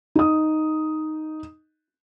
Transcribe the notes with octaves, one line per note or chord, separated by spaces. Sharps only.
D#4 D#6